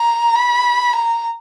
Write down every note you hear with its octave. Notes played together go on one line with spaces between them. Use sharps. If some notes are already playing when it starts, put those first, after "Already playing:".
Already playing: A#5
B5
A#5